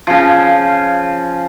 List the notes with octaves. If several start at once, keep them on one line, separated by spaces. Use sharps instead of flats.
C#3 F3